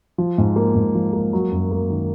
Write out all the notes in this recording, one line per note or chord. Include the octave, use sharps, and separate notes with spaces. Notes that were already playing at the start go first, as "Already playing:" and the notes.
F3
G#2
A#3
G#2
F3
A#3
F#3
F#2
A#3
D#3